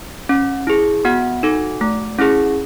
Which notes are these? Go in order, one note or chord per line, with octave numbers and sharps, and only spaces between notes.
C#4
E4 G#4
B3 F#4 F#5
D#4 A4
A3
C#4 E4 G#4